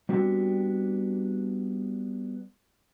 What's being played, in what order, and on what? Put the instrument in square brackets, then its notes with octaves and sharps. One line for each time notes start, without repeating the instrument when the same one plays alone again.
[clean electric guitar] G3 B3 C4 D4 F#4 G4